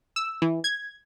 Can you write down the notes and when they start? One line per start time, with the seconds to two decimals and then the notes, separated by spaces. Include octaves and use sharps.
0.16 E6
0.42 E3
0.64 G#6